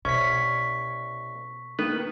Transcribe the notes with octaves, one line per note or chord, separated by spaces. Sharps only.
C2 B2 C#4 C#6 B6
D#3 A#3 B3 B4